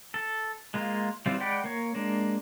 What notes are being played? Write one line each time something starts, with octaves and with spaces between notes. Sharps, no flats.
A4
G#3 A#3 F4
E3 G3 C4 F4
G#3 D5 F#5 G5 B5
A#3 C#5
G#3 A#3 D4